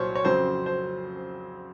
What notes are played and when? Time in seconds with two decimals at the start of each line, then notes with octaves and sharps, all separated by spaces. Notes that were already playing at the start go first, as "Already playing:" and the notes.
Already playing: C2 A#2 F#3 C5 C#5
0.15 C#5
0.25 F2 C#3 F#3 C4 C5
0.66 C5